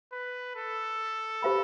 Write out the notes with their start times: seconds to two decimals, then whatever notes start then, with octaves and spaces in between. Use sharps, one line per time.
0.12 B4
0.56 A4
1.43 G4 C5 F5 B5